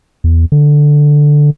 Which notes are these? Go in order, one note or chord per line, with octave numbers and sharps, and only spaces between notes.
E2
D3